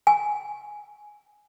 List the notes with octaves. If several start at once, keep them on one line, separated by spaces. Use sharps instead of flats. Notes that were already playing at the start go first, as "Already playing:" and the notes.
G#5